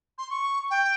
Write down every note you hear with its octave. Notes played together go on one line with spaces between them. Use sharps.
C6
C#6
G5